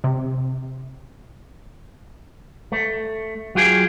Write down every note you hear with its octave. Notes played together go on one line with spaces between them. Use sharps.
C3
A3
F#3 F4 G4 G#4